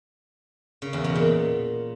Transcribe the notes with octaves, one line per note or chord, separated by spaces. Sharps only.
C#3
E2
B2
A#2